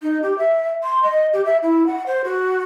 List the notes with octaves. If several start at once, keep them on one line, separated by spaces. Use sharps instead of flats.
D#4
G4
E5
C6
D#5
G4
E5
E4
F#5
C5
F#4